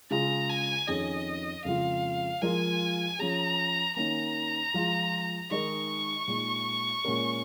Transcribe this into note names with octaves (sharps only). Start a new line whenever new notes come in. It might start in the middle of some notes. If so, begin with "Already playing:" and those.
C#3 G#3 F4 G#4 A#5
G#5
F2 D#3 C#4 G#4 D#5
F2 C#3 G#3 F4 F5
F3 G#3 F4 A#4 G#5
F3 C#4 G#4 A#5
D#3 A#3 C#4 A#5
F3 G#3 F4
D#3 G#3 D#4 A#4 C#6
A#2 G#3 D#4
A#2 G#3 C#4 A#4